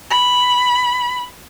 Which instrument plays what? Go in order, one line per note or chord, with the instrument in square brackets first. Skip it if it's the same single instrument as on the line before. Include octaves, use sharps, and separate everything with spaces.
[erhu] B5